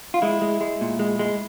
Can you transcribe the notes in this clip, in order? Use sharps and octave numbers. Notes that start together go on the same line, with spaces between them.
F4
G#3 E4
G#3
G#3
A#2
G#3
G#3